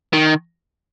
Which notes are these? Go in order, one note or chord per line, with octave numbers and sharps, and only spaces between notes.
D#3